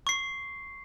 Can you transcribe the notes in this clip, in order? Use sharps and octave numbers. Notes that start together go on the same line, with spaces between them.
C#6 C7